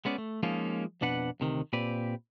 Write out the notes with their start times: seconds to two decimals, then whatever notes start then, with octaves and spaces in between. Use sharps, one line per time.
0.05 G#3 B3 C#4 D5
0.18 A3
0.43 F3 G#3 A#3 C#4 D#4 F4
1.01 F2 B2 D4 B4 F#5
1.40 D2 C3 D#3
1.73 A#2 C4 G4 B4 D5